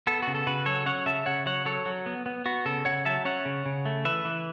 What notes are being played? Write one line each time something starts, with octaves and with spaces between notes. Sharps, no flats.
B3 A4
C#3 F#4
A4
C#3 F#4 B4
F#3 A4 C#5
C#4 C#5 F#5
C#3 E5 A5
C#3 C#5 F#5
F#3 C#5 F#5
F#3 A4 C#5
F#3
B3
B3
B3 F#4
C#3 A4
C#3 C#5 F#5
F#3 E5 A5
C#4 C#5 F#5
C#3
C#3
A3
E3 B4 E5
E3